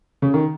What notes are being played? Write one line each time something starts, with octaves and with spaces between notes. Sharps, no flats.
C#3
D#3